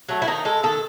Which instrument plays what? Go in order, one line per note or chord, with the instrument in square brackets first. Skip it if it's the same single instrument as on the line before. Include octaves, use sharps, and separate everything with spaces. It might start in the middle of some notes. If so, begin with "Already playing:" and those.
[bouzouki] F#3 A3
E4
D#3 D#4
G#3 A4
D#3 A4